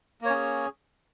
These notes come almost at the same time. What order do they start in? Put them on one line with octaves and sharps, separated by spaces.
A#3 C#5 C#4 G#4